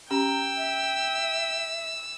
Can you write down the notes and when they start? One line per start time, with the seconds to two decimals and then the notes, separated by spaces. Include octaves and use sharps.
0.11 C#4 G4 G5 A#5 E6
0.57 E5